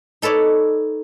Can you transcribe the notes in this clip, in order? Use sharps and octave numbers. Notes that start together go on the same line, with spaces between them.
D#4 A4 B4 C#5 D5